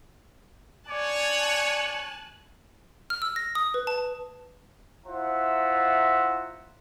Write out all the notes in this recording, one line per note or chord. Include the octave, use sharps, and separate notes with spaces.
C#5 D5 G#5 A5 D6 F#6
F6
E6
A#6
D#6
B4
A5
E4 F4 C5 E5 F#5 A#5